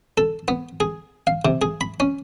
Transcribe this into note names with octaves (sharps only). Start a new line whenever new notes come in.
A4
B3
G#4
F5
C3
G#4
B5
C#4